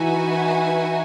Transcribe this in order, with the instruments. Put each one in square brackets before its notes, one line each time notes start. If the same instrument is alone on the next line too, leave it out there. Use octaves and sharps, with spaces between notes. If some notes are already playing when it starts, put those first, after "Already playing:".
Already playing: [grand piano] E3 [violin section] D#4 F#4 B4 E5 G#5